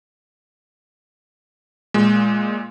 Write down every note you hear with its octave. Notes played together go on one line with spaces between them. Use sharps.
A#2 G#3